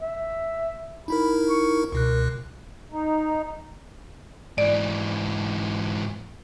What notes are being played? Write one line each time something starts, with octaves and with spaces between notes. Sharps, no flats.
E5
D#4 E4 A#4 B5
C#6
C#2 B2 A#4 F#6
D#4
G#2 E3 D5